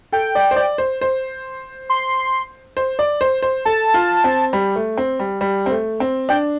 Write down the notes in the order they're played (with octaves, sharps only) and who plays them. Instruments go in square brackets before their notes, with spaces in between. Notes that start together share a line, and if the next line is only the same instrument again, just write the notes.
[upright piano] A4 [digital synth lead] G5
[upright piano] D5
C5
D5
C5
C5
[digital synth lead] C6
[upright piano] C5
D5
C5
C5
[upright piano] A4 [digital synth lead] A5
[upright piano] F4
C4
G3
A3
C4
G3
G3
C4
A3
C4
[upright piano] D4 [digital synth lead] G5